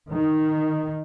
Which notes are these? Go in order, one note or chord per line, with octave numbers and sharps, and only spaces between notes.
D#3